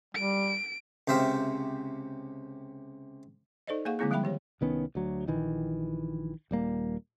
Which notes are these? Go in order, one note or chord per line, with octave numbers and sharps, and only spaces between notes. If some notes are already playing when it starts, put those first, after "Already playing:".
G3 D7
C#2 C3 C5 E5 F5 G5
D#4 A4 C5 D5 D#5
A#3 G#4 F5 F#5 C#6
D3 G#3 A#3 C4 E4 G#4
F3 G3 G#3 E5 G5 B5
D#3 G4 C#5
C2 D#3 B3 C#4
D2 F#3
A#1 D#3 E3
D#1 G3 A#3